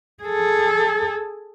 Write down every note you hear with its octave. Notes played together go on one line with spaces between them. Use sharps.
G#4 A4